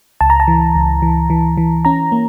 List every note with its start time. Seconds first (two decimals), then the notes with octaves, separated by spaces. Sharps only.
0.21 C#2 A5
0.30 A#5
0.40 A5
0.48 E3
0.75 C#2
1.02 E3
1.30 E3
1.57 E3
1.85 C#4 A#5
2.12 A#3